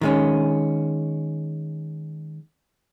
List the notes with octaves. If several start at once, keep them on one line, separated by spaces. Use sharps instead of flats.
D#3 G#3 C#4